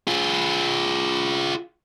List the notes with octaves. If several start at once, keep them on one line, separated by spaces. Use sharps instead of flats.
F4 G#4